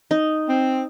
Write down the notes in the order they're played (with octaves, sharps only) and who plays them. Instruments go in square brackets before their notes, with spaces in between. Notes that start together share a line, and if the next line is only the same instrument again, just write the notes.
[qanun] D#4
[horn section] C4